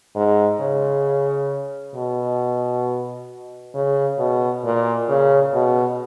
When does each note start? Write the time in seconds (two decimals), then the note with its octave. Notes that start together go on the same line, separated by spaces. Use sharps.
0.16 G#2
0.60 C#3
1.95 B2
3.74 C#3
4.19 B2
4.64 A#2
5.09 C#3
5.54 B2